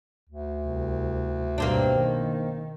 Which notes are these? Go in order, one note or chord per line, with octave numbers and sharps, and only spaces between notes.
D2
C2
B1 G2 A#3 C4 D4
D#3